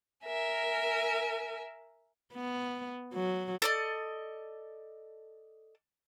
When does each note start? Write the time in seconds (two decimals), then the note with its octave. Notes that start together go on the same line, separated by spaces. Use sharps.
0.25 A#4 E5 G#5
2.34 B3
3.14 F#3
3.62 A4 D5 D#5